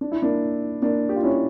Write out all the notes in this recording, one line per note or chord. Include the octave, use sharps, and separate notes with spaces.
D4
E4
A#3 D4
A#3 D4
G4
F4
C#4 E4